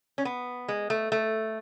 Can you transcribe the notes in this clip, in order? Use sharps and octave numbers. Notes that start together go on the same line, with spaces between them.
C#4
B3
G#3
A3
A3